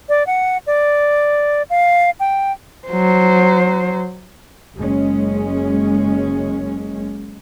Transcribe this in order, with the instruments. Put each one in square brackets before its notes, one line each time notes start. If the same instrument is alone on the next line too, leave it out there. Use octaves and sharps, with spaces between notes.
[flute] D5
F#5
D5
F5
G5
[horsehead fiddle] F#3 C5
[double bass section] F#1 G#3 C#4